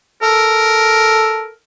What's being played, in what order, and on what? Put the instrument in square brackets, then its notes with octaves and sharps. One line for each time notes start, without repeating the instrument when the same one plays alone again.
[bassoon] A4 [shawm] A#4